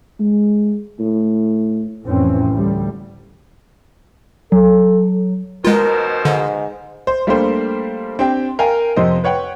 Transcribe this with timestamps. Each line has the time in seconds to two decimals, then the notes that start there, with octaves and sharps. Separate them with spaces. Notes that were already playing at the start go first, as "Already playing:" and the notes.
0.20 G#3
1.00 A2
2.05 F2 A2 E3 C4 C#4
2.50 D2 G3
4.52 F#3 A4
5.65 B2 D#3 G#3 F4 A#4 C5
6.25 G#2 D3
7.07 C5
7.27 G3 A3 A#3 D4 G4 C5
8.19 C4 D4 G4 G5
8.59 A#4 F5 G5 G#5
8.96 F2 C3 C5 D#5
9.24 B4 C#5 F#5 G5